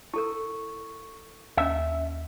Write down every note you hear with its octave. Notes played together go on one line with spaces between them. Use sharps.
E4 A4 A#4 C#6
D#2 C#4 D#5 E5